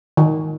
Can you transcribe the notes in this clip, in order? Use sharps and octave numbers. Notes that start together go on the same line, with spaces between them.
D#3